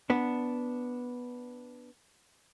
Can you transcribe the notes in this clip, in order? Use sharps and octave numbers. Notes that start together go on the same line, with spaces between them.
B3 D4